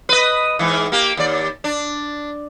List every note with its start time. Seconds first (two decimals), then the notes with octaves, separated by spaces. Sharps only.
0.09 B4 D#5
0.59 G#2 E3
0.92 A#3 G4
1.17 D#2 D5
1.64 D4